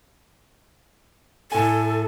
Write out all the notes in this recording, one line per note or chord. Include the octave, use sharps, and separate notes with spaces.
A2 A4 G#5